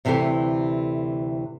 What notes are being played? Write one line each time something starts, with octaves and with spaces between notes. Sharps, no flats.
D2 C3 E3 E4 G4 A4